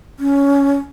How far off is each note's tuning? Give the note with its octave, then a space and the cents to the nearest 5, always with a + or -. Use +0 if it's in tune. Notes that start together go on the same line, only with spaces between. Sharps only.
C#4 +10